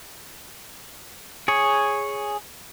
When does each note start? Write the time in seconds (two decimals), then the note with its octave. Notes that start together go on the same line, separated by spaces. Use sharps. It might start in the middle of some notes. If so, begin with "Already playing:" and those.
1.48 G#4 C#5